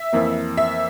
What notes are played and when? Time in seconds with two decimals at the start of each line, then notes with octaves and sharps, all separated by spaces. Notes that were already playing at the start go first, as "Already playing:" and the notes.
Already playing: E5
0.13 F2 E3 A#3
0.57 E5